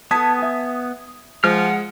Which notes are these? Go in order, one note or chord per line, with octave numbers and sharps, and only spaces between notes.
B3 A4 A5 D#6 G#6 B6
E5 G#5
F3 G#3 F#5 F6